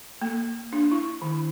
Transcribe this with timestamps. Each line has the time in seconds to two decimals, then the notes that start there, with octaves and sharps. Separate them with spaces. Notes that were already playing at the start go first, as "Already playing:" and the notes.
0.22 A#3
0.73 D4
0.92 E4
1.22 D#3